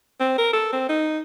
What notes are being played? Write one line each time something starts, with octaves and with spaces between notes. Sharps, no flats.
C4
A#4
A4
C4
D#4